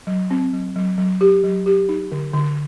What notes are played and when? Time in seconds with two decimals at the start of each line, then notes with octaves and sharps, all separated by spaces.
0.07 F#3
0.30 C4
0.53 F#3
0.76 F#3
0.98 F#3
1.21 G4
1.44 F#3
1.66 G4
1.89 D#4
2.12 D3
2.34 D3